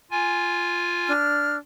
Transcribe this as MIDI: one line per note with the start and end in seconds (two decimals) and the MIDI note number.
0.11 1.13 65
0.11 1.13 80
1.07 1.56 62
1.07 1.56 89